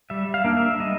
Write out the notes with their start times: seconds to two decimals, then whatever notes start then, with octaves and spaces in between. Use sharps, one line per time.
0.10 G3 E5
0.34 F5
0.45 A#3 D4
0.57 E5
0.80 G3 D#5